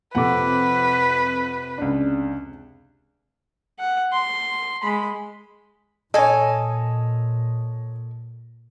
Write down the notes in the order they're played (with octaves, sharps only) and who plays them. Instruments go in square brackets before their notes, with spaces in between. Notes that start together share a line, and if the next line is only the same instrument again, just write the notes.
[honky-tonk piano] F2 C3 D6 [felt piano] A4 F#5 [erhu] B4
[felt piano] C#2 D4
[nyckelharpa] F#5
C6
G#3 B5
[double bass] A#2 [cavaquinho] A4 G#5 [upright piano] C#5 D#5